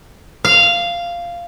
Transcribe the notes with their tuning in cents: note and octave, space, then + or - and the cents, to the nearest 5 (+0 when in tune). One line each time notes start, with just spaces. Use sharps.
F5 -10